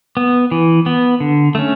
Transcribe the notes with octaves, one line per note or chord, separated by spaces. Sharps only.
B3
E3
B3
D3
A3 C#4